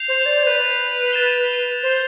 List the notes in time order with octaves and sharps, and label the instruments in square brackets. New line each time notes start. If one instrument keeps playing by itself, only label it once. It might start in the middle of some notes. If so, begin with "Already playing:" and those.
Already playing: [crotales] G6 C7 F7
[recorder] C5
D5
C5
B4
[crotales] A6 E7 G7
[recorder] C5